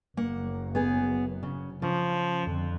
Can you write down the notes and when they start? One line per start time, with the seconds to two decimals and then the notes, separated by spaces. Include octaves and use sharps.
0.17 F#1 F#2 A#3 F#5
0.75 B3 G#4
1.43 C#3
1.82 C#3 F3
2.43 F2 D3